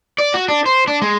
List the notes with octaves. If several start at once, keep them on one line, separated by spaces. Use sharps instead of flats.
D5
F#4
D4
C5
D4
G#3